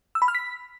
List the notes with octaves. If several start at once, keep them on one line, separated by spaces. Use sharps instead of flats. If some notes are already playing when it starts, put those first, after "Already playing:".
E6
B5
F6
B6